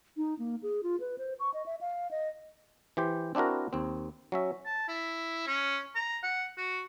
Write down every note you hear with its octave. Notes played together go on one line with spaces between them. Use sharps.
D#4
A#3
G#4
F4
B4
C5
C#6
D#5
E5
F5
D#5
E3 G4 C5
C4 D4 E4 F#4 A#4
D#2 C4
F#3 C#4 E5
A5
E4
C#4
A#5
F#5
F#4